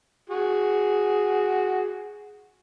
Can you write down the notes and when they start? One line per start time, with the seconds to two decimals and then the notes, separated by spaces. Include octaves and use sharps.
0.30 F#4 G#4